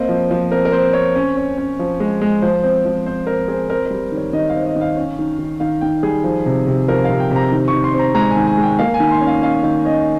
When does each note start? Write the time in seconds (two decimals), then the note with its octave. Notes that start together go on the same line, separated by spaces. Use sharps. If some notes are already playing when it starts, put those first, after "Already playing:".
Already playing: A#3 C4 D#5
0.09 F3
0.31 F3
0.51 C4 A#4
0.65 A#4
0.72 C4 C5
0.93 C4 C#5
1.16 C#4
1.37 C#4
1.58 C#4
1.79 F3
2.00 G#3
2.21 G#3
2.42 F3 C5
2.64 C4
2.85 F3
3.06 C4 C5
3.27 C4 A#4
3.48 C4 G#4
3.69 C4 A#4
3.86 G3 A#4
4.12 D#3
4.17 C#5
4.33 D#3 D#5
4.49 F5
4.55 C4
4.66 D#5
4.76 D#3 F5
4.97 C#4
5.19 D#3
5.39 D#3
5.60 D#3 F5
5.81 D#3 G5
6.03 G3 G#4
6.24 F3
6.46 C3
6.67 C3
6.88 F3 A#4
7.04 F5
7.10 C3
7.20 G5
7.31 C3
7.36 A#5
7.52 D#3
7.68 C#6
7.73 D#3
7.84 C6
7.94 C4
7.99 A#5
8.15 G#3 A#5
8.30 G#5
8.37 D#3
8.47 G#5
8.58 G#3
8.63 G5
8.79 A#3 F5
8.94 G#5
9.00 D#3
9.11 C6
9.21 C#4
9.27 F5
9.42 C#4 F5
9.63 D#3 F5
9.85 C#4 D#5